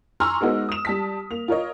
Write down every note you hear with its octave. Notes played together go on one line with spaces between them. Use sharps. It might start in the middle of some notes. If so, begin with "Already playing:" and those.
G#5 A#5 C6 C#6 E6 F6
G#3 B3 D#4 F#4 A#4 C5
D#6 E7
G3 A5 B6
A#3 F7
F4 A#4 C#5 D#5